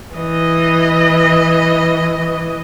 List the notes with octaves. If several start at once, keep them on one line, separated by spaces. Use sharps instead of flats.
E3 D#5